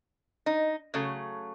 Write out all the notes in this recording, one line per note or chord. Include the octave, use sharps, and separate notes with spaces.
D#4
C#3 F#3 A3